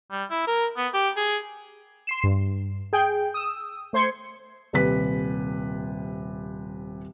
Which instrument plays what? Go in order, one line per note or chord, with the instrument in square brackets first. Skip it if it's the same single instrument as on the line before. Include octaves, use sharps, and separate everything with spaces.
[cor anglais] G3
E4
A#4
B3
G4
G#4
[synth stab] C6 C7 E7
G2
G#4 G5
D#6 E6
A3 C5 C6 G#6 C#7
[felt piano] D#1 C3 B4 B6